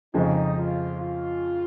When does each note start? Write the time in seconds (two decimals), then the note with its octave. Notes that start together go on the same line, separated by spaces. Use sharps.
0.14 F2 C#3 F3 G#3 C#4 D#4
0.57 F4
0.99 F4